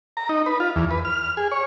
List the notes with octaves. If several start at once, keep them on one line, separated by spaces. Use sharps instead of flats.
A#5
D#4
B4
F4
E2
B4
F6
G#4
C#5